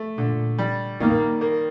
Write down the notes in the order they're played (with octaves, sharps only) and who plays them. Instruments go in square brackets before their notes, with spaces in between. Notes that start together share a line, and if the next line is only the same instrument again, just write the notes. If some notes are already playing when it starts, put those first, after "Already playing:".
Already playing: [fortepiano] A3
[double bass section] A#2 [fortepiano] D3
[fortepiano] G3
[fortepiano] D#3 [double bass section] A#3
[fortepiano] A#3